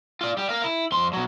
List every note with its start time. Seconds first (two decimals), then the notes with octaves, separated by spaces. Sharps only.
0.21 F4 D5
0.37 G3 G4
0.49 A#4 F5
0.64 E4
0.92 F2 C6
1.13 B2 F#3